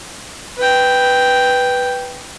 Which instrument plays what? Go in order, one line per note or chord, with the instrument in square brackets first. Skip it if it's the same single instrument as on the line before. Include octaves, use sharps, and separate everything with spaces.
[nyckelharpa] B4 G5